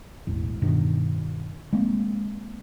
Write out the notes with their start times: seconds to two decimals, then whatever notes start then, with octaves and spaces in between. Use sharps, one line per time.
0.27 E1 A1
0.62 G2 B2 D#3
1.73 G#3 A#3 C4